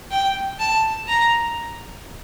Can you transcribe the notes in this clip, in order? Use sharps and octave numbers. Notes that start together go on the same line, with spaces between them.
G5
A5
A#5